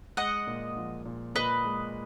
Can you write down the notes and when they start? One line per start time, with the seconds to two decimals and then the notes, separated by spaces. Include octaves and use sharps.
0.17 G#3 D#5 F#5
0.47 A#2
0.77 F3
1.05 A#2
1.35 A#2 B4 D#5
1.65 G#3